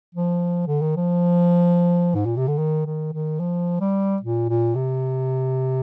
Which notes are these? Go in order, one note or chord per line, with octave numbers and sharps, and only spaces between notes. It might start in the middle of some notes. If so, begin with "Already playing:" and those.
F3
D3
D#3
F3
G#2
A#2
C3
D3
D#3
D#3
D#3
F3
G3
A#2
A#2
C3